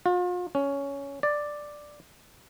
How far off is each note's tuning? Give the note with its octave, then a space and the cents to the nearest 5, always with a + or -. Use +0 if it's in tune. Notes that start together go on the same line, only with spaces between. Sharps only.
F4 +40
C#4 +10
D5 +5